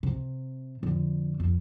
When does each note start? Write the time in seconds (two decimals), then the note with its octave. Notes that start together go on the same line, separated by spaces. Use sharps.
0.03 C3
0.83 F2 D3
1.40 F2